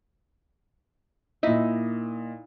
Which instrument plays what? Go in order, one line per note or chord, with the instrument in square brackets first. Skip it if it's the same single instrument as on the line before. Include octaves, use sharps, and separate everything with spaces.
[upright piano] A#2 D#5 [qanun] D#4 E4